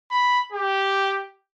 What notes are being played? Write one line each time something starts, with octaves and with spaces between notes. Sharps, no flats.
B5
G4